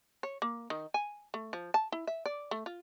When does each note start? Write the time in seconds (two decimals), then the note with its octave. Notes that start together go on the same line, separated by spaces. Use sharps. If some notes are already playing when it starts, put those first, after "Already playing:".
0.23 C#5
0.42 A#3
0.70 D#3
0.94 G#5
1.34 A3
1.53 F3
1.74 A5
1.92 E4
2.07 E5
2.26 D5
2.51 A3
2.66 F4